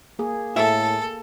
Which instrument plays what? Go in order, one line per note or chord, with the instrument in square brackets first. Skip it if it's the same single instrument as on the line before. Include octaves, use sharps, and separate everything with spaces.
[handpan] A#3 G#4
[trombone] A2 [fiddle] A4 [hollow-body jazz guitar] E5